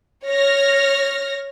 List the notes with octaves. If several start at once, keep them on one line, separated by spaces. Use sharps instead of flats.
C#5 F6 A#6